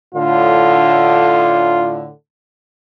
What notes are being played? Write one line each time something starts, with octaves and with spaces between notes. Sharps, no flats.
A2 D3 F4